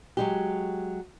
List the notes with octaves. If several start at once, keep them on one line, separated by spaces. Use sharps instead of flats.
F#3 G#3 G4